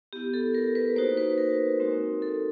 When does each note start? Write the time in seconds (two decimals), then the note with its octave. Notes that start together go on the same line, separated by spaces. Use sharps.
0.13 B3 E4 G4
0.34 A4
0.54 A#4
0.75 B4
0.96 A#3 D#4 F#4 C5
1.17 B4
1.38 A#4
1.80 G#3 C4 D#4 F#4
2.22 A4